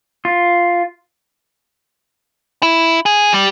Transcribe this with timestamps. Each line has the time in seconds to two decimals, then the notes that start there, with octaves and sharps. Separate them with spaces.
0.25 F4
2.63 E4
3.06 G#4
3.33 G3